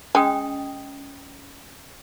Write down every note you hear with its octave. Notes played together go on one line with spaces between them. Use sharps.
G#3 C#4 D#5 G5 D#6